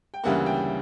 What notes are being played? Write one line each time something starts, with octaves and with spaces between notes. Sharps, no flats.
G5
D2 C#3 E3 G3 A#3 F#5
G5